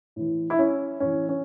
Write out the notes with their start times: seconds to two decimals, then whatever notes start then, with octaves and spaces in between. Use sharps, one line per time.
0.16 A2 E3
0.50 E4
0.59 C#4
1.00 A2 E3 C#4
1.29 C#4